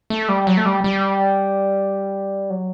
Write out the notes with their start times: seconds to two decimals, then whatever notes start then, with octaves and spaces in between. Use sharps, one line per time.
0.10 A3
0.29 G3
0.47 F#3
0.57 A3
0.66 G3
0.84 G3
2.50 F#3